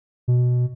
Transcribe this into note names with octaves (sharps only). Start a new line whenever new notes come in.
B2